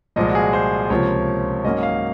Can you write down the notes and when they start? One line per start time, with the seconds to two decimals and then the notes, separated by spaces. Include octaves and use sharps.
0.16 C2 A#2 F3 G#3 D#5
0.30 F#4
0.35 G#4
0.53 C5
0.90 C#2 C3 F3 A#3 C#5
1.64 G#2 F#3 A#3 C#4 D#5
1.83 F5